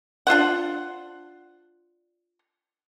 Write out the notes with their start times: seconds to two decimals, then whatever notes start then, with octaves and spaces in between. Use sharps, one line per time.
0.27 D4 F4 C5 F#5